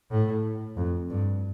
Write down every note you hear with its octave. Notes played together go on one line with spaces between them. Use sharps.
A2
F2
G2